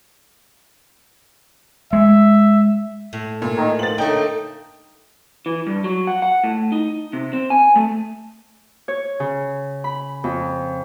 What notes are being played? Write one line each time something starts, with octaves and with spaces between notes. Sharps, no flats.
G#3 E5
A2
A#2
D#3
B2 D#3 F3 A6 F#7
A2 D3 A3 A#3 D#4 G5
E3
G2
F#3
F#5
F#5
A2
D#4
C3
C4
G#5
A3
C#5
C#3
B5
F2